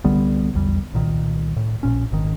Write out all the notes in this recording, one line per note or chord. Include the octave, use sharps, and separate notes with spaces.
C2 D3 G3 B3
A#1 E2 G3
C2 A#2 D#3
A2
A#1 A#2 C#4
G#1 D#3